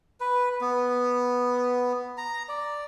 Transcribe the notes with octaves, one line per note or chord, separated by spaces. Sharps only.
B4
B3
A#5
D5